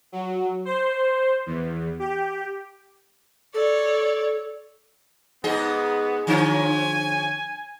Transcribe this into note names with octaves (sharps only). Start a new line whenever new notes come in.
F#3
C5
E2
G4
A4 C#5 D5
G#2 B3 G#4 D#5
D3 F3 C#4 G#5